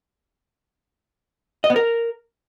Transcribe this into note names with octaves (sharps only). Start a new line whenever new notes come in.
D#5
B3
A#4